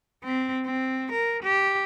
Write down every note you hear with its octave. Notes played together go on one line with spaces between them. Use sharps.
C4
C4
A#4
G4